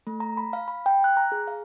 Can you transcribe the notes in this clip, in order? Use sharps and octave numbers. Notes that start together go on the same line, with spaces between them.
A3
A#5
B5
F5
B5
G5
F#6
A#5
G#4
F5